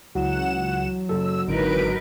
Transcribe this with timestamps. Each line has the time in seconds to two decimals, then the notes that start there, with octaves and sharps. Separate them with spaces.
0.15 C#2 E3 F#3 F#5 E7
1.09 F#1 A4 E6
1.48 G#1 D3 E3 D#4 A#4 B4 D7